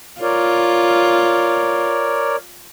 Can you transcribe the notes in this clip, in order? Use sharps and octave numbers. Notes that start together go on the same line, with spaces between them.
F4 A#4 C#5 D5